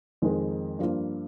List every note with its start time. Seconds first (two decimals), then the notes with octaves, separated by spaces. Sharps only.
0.22 F2 D#3 G#3 D#4 A#4
0.79 G2 F3 A#3 F4